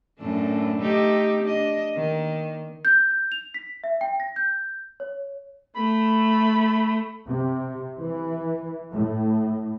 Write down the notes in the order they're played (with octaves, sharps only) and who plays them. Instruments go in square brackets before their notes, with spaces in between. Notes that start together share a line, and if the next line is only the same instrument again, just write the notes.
[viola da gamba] F#2 A2 D4
A3 D#4 G4
D4 D#5
D#3 A#3
[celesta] G6
G6
F7
B6
E5
G5
A#6
G6
C#5
[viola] A3 [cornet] B5
[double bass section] C3
E3
A2